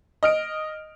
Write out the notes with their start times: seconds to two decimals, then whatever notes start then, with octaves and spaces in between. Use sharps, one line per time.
0.23 D#5 F6 D7